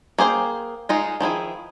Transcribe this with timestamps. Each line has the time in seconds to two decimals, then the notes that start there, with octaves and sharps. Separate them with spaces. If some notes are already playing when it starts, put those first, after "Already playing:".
0.18 A#3 G#4 C5 G5
0.89 G#3 D#4 F4
1.21 D#3 F3 E4 G#4